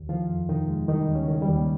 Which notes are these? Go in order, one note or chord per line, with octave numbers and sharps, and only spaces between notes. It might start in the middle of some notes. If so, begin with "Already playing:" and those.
Already playing: D#2
D#3 F3 F4
F2
C3 D#3 D#4
G#3
D#3 G3 D#4
D#2
C#3 C#4
D#3
G3 G4
D#2